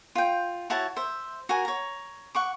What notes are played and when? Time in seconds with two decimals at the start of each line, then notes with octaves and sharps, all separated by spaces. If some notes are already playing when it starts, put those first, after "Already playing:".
0.15 F4 G5
0.70 E4 F#4 C#5 A5
0.96 C5 E5
1.49 F#4 A#4 G#5
1.65 C#5 A#5
2.35 F#5 C#6 D6